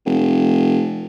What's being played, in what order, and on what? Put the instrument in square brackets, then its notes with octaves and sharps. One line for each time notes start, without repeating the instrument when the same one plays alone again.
[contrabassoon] F1